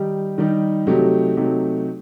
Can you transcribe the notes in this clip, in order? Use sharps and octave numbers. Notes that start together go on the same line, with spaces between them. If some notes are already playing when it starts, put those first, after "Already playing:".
Already playing: D#3 G3 D#4 G4
D#3 G3 D#4 G4
C3 F#3 A3 D#4 G4
C3 F#3 A3 D#4 G4